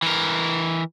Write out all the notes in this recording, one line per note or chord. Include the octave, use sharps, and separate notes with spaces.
E3 A#4